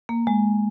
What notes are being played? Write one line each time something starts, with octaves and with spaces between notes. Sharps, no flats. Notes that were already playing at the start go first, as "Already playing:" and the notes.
A#3
G#3